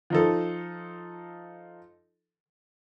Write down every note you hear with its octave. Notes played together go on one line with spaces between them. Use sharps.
F3 D#4 A4